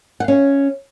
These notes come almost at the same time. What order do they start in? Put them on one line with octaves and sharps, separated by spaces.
F#5 F5 C#4 C#5